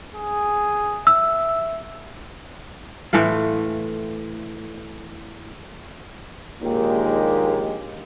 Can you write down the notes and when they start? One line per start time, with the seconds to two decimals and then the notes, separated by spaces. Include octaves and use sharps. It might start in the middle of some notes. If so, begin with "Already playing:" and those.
0.14 G#4
1.07 E5 E6
3.13 A2 E3 A3 F4
6.63 A#1 D#2 A#2 D#3 G#3 G4